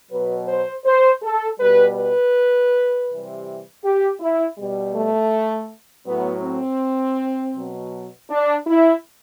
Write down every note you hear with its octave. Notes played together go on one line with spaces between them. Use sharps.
B2 F#3 B4
C5
C5
A4
B2 G3 B4
B4
C3 E3 G3
G4
E4
B2 G3
A3
A2 F#3 B3
C4
B2 F#3
D4
E4